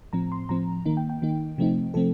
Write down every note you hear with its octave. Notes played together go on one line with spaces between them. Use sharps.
A2 F3 C4 A#5
C6
A2 F3 C4 A#5
D#3 A#3 D#4
G5
G5
D#3 A#3 D#4
C3 F3 A3 C4 D#4
C3 F3 A3 C4 A4